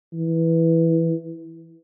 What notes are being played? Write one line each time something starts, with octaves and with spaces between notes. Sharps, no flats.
E3